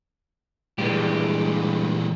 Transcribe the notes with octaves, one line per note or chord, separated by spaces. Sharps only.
G2 A#2 E3 G#3 G4